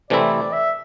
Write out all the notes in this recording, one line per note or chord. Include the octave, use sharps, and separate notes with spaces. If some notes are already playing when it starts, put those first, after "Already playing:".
C3 E3 A3 C4 E4 D5
E5